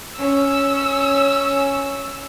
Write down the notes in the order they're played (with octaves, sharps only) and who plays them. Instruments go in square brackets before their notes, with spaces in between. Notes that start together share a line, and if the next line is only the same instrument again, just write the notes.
[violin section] C#4 [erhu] E6